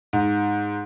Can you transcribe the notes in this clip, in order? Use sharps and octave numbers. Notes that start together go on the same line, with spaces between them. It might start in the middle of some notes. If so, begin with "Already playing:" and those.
G#2